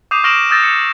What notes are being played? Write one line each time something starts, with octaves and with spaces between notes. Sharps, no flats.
D6 D#6 G6 C7 D#7 F7
C#6 F6 A#6 D7 E7 F#7
D#6 E6 G6 A6 A#6
C#7